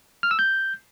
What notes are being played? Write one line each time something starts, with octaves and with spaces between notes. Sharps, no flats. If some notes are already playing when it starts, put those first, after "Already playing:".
F6
E6
G6